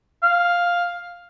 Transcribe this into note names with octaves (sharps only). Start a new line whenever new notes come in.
F5